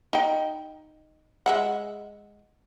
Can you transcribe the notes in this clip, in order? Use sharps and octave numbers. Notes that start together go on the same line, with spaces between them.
D#4 G5
G#3 E5 F#5